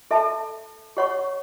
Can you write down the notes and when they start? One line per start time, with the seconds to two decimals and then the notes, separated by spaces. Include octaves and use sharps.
0.11 A4 E5 A5
0.97 G4 C#5 F#5 C#6